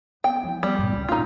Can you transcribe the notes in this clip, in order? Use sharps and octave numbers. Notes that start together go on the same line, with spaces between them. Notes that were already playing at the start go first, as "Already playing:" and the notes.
B3 G5
F3 E4
G3 B3
G2 A#2
G#1 C#2
A#1 E2 D#4 F4